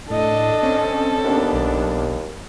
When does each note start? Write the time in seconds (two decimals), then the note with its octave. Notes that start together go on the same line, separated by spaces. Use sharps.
0.10 A2 D4 A4 D#5
0.63 C4 C#4
1.24 D#2 B3 D4
1.53 B1